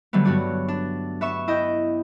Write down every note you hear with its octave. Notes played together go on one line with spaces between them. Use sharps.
D3 F#3 G3 A3 B3
G2 B3 F#4 C#5 D5
D4
B3 E5 C#6 E7
E4 D#5 G5 G6